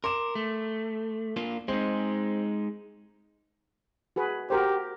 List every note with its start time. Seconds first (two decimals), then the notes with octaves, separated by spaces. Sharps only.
0.04 A#4 C6 D6 E7
0.35 A3
1.36 A#3 D4 F4
1.68 G#3 C4 D#4
4.16 F#4 G#4 B4
4.50 F#4 G4 A#4 C5